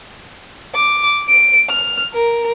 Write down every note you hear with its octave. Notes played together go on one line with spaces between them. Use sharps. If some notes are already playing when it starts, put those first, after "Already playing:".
D6
D7
F6
A#4